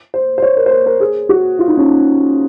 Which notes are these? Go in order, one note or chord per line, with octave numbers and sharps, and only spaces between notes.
C5
C5
C#5
A#4
C5
A#4
A#4
G#4
F#4
F4
D#4
C#4
D#4